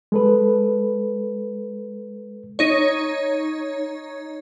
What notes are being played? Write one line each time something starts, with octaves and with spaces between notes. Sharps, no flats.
G#3 A4 B4
D#4 C#5